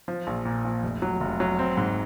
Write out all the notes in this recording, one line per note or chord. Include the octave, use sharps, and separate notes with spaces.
F3
A#1
A#2
F3
F1
F#3
F1
F#3
C4
G#2